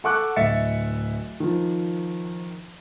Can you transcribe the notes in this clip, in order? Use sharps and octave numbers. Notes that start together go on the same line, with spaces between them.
A4 F#5 C#6 D6 F#6
D1 D#5 E5 A6 C#7
D#3 F3